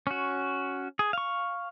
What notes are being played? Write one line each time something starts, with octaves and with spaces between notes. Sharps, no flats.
C#4 F#4
G#4
F5 C#6